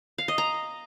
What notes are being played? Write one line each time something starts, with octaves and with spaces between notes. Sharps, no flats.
F5
D#5
A#5